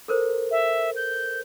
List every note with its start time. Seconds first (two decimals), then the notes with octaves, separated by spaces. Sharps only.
0.08 A4 A#4 C5
0.51 E5
0.96 G6